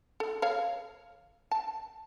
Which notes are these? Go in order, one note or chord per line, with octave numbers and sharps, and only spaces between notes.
A4
A4 C#5 F5
A5